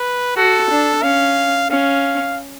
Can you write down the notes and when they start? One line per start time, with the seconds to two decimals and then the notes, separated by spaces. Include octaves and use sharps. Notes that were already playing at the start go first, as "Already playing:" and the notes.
Already playing: B4
0.37 F#4 A4
0.70 D4
1.03 C#4 F5
1.70 C#4 F5